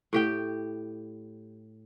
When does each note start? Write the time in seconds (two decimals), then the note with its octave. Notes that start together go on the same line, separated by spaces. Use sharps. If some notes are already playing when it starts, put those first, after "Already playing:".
0.13 A2 G4 G5